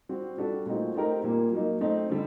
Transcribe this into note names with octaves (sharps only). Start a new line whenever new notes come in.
G3 C4 F#4
G3 D4 F#4 A4
A#2 A3 C4 D#4 F#4
A3 C4 D#4 G4 A#4
A#2 G3 A#3
F#3 A#3 D#4
A3 C4 D#4
D3 G3